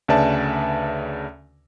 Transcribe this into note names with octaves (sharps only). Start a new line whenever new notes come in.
D2 C#3 B4 D5 E5 A5